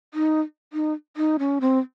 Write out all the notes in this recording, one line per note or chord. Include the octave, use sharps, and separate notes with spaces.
D#4
D#4
D#4
C#4
C4